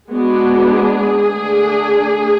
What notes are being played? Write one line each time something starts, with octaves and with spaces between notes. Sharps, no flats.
G#3 B3 D4 F#4
G#4
D3 A3 D4